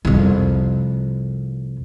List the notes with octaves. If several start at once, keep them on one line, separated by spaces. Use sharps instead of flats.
C2 F2